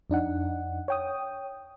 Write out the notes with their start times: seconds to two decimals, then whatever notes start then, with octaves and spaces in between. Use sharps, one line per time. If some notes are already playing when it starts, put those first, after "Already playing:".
0.10 F2 D4 D#4 F#5
0.88 C#5 G5 D#6